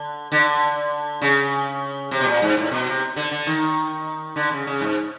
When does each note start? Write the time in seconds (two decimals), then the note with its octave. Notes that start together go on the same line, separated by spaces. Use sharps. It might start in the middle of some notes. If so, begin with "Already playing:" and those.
Already playing: D3
0.32 D3
1.22 C#3
2.11 C3
2.20 B2
2.27 A#2
2.42 G#2
2.57 A2
2.71 B2
2.86 C3
3.16 D3
3.31 D3
3.47 D#3
4.36 D3
4.51 C#3
4.67 C#3
4.81 G#2